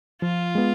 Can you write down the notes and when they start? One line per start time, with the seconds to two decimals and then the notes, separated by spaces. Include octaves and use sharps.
0.22 F3 F4
0.55 G#3 B3